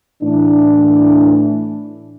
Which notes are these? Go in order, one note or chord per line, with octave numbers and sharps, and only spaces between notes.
A2 E3 D4